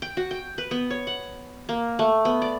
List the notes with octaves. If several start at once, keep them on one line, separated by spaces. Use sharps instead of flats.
G5
F#4
G5
B4
B3
C#5
F#5
A#3
A3
B3
D5